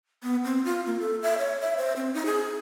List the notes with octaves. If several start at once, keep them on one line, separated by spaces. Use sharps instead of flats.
B3
C4
F4
A#3
A4
E5
C#5
E5
C5
C4
D#4
G#4